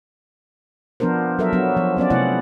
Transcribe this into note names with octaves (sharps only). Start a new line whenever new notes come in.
F3 B3 D4 A#4 C5
F#3 A4 A#4 C5 E5
F#3 B3 D4
F3 B3
F#3 B3 C#4 D5
C3 A3 B3 E4 D5 F#5